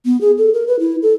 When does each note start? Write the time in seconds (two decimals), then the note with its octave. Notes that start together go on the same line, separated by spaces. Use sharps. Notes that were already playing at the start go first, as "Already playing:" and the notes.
0.05 B3
0.21 G#4
0.38 A4
0.54 A#4
0.67 B4
0.79 E4
1.02 A4